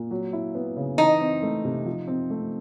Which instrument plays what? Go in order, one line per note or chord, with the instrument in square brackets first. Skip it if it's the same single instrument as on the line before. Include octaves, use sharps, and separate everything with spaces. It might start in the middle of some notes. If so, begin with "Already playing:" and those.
Already playing: [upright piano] A#2
F#3
E4
B3
C#3
[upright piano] E3 [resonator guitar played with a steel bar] D#4
[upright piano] C4
A3
C3
F3
C4
A3